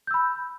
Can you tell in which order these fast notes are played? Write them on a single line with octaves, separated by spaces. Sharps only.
G6 E6 B5